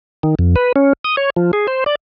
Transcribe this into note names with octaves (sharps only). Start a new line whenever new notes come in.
D#3
F2
B4
C#4
D#6
C#5
F3
G#4
C5
D5